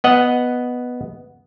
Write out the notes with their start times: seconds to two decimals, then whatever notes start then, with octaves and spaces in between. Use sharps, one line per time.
0.04 B3 D#5 F#5